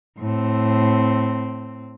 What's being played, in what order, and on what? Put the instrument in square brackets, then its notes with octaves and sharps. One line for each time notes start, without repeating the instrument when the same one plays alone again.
[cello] A2 C4